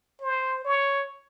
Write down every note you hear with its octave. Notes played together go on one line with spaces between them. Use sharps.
C5
C#5